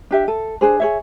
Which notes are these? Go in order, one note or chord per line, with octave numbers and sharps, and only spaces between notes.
D4 G4 E5
A4
D4 G#4 C5
G#4 C#5 E5